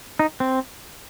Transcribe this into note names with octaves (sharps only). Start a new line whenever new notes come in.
D#4
C4